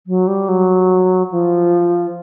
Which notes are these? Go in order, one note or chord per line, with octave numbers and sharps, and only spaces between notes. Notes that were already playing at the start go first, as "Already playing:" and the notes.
F#3
G3
F#3
F3